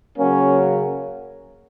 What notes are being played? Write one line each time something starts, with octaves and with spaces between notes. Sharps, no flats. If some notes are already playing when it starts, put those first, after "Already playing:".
C#3 F#3 A#3 C#4